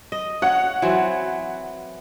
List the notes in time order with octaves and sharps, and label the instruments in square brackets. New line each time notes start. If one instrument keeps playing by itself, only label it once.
[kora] D#5
[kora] C#5 [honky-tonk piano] F#5
[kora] E3 F#3 C4